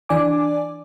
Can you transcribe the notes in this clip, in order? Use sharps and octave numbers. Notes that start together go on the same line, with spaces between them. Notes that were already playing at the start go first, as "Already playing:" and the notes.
E3 D4 D5 G#5 D6